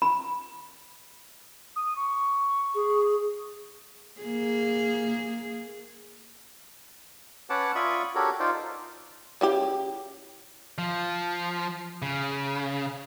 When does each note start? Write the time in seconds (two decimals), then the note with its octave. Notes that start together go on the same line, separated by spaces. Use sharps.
0.02 B5
1.76 D#6
1.96 C#6
2.75 G#4
4.21 A#3 G#4
7.50 C#4 B4 C#5 F#5 A5 D6
7.75 F4 D5 E5 B5 C#6 D#6
8.15 D4 F#4 G4 A4 A#4 C#5
8.40 D#4 F4 C5 D5
9.41 C#3 E4 G4
10.78 F3
12.02 C#3